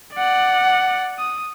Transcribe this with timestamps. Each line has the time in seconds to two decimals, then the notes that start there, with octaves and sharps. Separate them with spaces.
0.14 D5 F#5
1.18 D#6